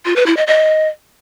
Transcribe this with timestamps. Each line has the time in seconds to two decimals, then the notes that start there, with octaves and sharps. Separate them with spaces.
0.06 F4
0.16 B4
0.26 E4
0.37 D#5
0.47 D#5